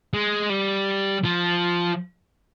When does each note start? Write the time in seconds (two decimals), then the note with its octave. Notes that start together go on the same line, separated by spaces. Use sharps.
0.14 G#3
0.50 G3
1.24 F3